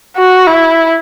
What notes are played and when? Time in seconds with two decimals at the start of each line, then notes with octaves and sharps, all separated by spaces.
0.16 F#4
0.47 E4